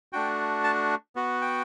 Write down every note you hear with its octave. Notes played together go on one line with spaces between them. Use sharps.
A3 D4 F#4 G5
A5
B3 F#4
G5